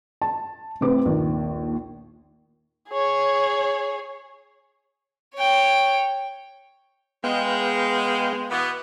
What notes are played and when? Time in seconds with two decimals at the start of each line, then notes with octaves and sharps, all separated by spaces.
0.22 A5
0.81 A2 C3 C4 B4 D6
1.06 A#1 D#2
2.89 G#4 C#5
5.35 C#5 G5
7.24 G#3 B3 F5 G5
8.51 B2 E3 B3